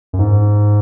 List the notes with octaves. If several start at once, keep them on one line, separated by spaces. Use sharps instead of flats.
F#2
G#2